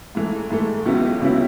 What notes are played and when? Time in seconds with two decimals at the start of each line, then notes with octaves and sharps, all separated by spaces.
0.15 G#2 E3 A3
0.50 G#2 E3 A3
0.86 C#2 C#3 F#3 B3 E4
1.22 C#2 C#3 F#3 B3 E4